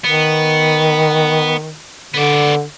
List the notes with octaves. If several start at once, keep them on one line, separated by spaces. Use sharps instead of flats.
D#3 B3
D3 B3 D5